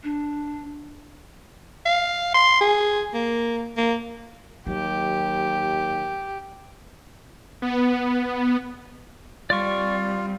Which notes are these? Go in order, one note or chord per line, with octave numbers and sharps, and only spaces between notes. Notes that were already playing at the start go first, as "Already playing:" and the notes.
D4
F5
C6
G#4
A#3
A#3
D#2 F#3 G4
B3
G3 C4 F4 D5 C#6